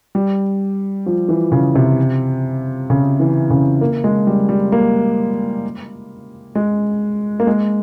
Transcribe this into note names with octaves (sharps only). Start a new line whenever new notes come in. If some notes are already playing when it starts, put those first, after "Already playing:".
G3
F3
E3
C#3
C3
C#3
E3
C#3
A#3
G#3
G3
G3
A#3
G#3
A#3
G#3